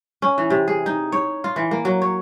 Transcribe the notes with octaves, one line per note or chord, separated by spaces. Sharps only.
C#4
E3
C3
G#4
D#4
C#5
F4
E3
A#3
F#3
C#5